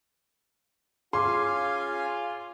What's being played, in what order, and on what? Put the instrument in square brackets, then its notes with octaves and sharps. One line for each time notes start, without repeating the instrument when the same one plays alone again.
[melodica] C#4 F5 G#5 [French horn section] F4 [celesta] G#4 D6 [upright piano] C6